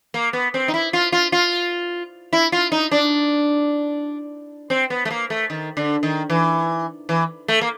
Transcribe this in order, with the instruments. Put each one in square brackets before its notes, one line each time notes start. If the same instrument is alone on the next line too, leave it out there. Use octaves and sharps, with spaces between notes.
[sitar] A#3
B3
C4
D#4
E4
F4
F4
F4
E4
F4
D#4
D4
C4
B3
A3
A#3
A3
D#3
D3
D#3
E3
E3
A3
A#3